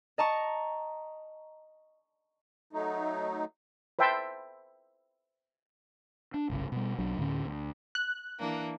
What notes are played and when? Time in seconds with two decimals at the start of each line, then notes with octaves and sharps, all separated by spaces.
0.18 D#5 A5 A#5 C#6
2.73 F#3 A3 D#4
3.99 B4 C5 E5 G5 A5 C6
6.34 D4
6.50 G1 C2 C#3
6.72 B2 G3
6.99 B1 F#3 D4
7.18 D2 A2 D3 C#4
7.46 D2
7.95 F#6
8.39 E3 A#3 D4